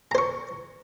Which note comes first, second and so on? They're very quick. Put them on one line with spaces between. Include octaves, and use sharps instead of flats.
A#5 C5 C#6